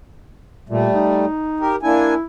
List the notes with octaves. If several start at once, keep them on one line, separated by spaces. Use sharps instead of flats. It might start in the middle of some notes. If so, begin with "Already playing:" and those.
A#2 G3 A3
D#4
G4 A#4
A#3 D4 E4 G#5